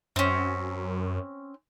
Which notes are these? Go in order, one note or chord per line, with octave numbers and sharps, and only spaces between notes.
F#2 C4 C#4